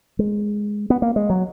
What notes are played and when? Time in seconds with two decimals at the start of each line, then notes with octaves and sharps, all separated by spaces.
0.19 G#3
0.90 B3
1.02 A#3
1.16 G#3
1.30 F#3